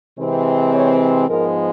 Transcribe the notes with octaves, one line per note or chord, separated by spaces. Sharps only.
C3 E3 G#3 C4
C#5
G#2 F3 G#3 B3 A#4